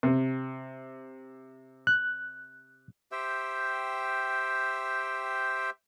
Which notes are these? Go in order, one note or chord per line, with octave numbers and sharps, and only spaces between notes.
C3
F#6
G4 C5 E5 G5